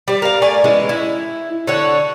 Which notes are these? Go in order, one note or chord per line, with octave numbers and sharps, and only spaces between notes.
G3 D5
A#4 F5
A3 D5 G#5
E3 G#3 C#4
E4
D3 A4 C#5 F#5